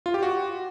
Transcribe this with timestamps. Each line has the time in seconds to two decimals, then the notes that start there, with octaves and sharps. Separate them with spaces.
0.06 F4
0.14 G4
0.23 F#4